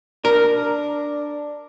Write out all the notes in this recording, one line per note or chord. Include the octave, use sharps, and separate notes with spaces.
D4 A#4